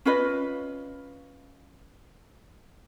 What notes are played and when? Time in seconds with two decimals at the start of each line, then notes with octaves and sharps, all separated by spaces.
0.05 C#4 F4 B4 D#5